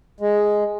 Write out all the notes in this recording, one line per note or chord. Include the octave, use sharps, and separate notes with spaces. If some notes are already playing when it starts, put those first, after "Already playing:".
G#3